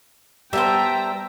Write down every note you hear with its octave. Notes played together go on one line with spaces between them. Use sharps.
G3 B3 C5 E5 G5 A5 A#5